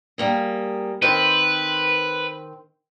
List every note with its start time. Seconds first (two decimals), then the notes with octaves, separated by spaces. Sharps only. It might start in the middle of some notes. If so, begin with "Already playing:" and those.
0.18 G3 A#3 G#4
1.02 D#3 C4 B4 C5